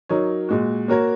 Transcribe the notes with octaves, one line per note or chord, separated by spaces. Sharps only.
F#3 D#4 A#4 C#5
A#2 G#3 F#4
A#3 F#4 A#4 C#5